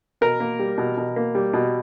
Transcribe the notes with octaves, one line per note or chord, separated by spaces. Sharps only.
B2 A#4
A#3
G3
B2
B2
A#3
G3
B2